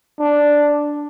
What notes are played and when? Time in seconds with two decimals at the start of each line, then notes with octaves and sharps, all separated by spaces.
0.19 D4